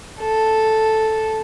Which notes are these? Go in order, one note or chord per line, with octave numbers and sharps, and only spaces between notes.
A4